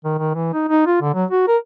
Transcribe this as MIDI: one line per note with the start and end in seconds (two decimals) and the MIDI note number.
0.05 0.15 51
0.18 0.33 51
0.34 0.52 52
0.54 0.67 63
0.69 0.85 63
0.86 0.98 65
1.01 1.14 50
1.14 1.25 54
1.31 1.43 66
1.48 1.57 70